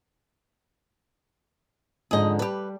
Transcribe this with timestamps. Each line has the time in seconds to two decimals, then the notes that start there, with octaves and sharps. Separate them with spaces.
2.11 F2 G#2 D3 G#4 D#5
2.39 G3 G4 B4 D5